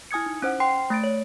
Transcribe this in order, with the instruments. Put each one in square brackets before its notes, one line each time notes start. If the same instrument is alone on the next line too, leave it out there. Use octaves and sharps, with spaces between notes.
[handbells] E4 G#5 D#6 G#6 C#7
D#4
C#4 C5 F#5
C5 G5 C6 C7
A3 A6 D7
C#5